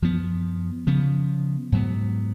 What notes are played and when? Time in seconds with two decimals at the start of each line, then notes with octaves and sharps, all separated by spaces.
0.02 F#2 F3 B3
0.87 C#3 F3 B3
1.72 G#2 F#3 B3